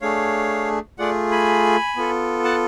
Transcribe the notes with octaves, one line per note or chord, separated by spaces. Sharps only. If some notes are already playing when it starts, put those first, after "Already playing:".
A3 D4 G#4 C#5 F5
A3 F4 G#4 D5 F#5
G#5 B5
B3 F4 A4
F#5 A5